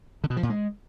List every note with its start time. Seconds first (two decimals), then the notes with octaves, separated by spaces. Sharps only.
0.24 D3
0.30 B2
0.37 F3
0.43 A#2
0.50 G#3